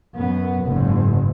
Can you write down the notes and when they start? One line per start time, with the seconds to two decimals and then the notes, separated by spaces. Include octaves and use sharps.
0.15 F#2 B3
0.64 F#1 G#2